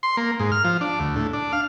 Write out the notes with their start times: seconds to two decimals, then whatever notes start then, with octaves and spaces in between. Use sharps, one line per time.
0.03 C6
0.17 A#3
0.40 G#2
0.52 F6
0.64 F3
0.81 D4
0.99 D2
1.16 A2
1.33 D4
1.53 F5